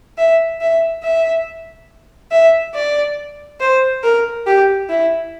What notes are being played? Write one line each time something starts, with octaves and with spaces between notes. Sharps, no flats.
E5
E5
E5
E5
D5
C5
A#4
G4
E4